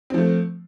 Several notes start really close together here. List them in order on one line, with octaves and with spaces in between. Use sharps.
C4 F3 A3